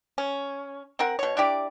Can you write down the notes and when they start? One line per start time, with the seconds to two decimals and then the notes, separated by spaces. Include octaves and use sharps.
0.18 C#4
0.99 C4 A#4 F#5
1.19 B2 C#5
1.37 D4 E4 G4 D5